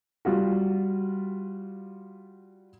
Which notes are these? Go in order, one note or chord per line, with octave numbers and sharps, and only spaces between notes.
G3 F4 F#4